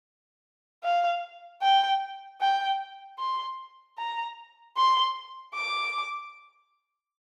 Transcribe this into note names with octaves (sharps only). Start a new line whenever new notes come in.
F5
G5
G5
C6
A#5
C6
D6